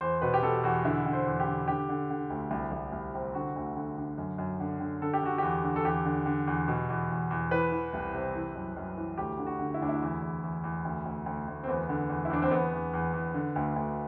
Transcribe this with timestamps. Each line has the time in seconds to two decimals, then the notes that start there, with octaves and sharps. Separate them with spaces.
0.01 E2 C5
0.22 B2 B4
0.34 G4
0.42 B2 A4
0.63 E2 F#4
0.85 D3 E4
1.06 D3
1.13 C5
1.27 E2
1.40 G4
1.47 D3
1.68 D3 G4
1.89 D3
2.10 D3
2.30 D2
2.51 C2
2.72 C2
2.92 C2
3.15 C3
3.35 D3 F#4
3.56 D2
3.77 D3
3.97 D3
4.18 F#2
4.38 F#2
4.60 D3
4.80 D3
5.02 D3 A4
5.13 G4
5.23 D3 F#4
5.38 E2 G4
5.63 D3
5.76 A4
5.85 E2 G4
6.06 D3
6.26 D3
6.47 E2
6.68 B2
6.89 E2
7.10 E2
7.31 E2
7.51 E3 B4
7.72 E3
7.94 C2
8.15 C3
8.35 E3
8.55 F#2
8.77 F#2
8.97 E3
9.18 D2 G4
9.39 D3
9.47 F#4
9.59 D3
9.74 E4
9.81 D2 D4
9.89 E4
10.02 E2
10.22 E2
10.43 E2
10.64 E2
10.85 D2
11.05 D2
11.26 D2
11.48 D2
11.64 C4
11.68 E2 B3
11.89 D3
12.10 E2
12.25 E4
12.30 E2 D4
12.42 C4
12.51 E2 B3
12.73 E2
12.94 E2
13.14 E2
13.34 D3
13.56 D2
13.76 D2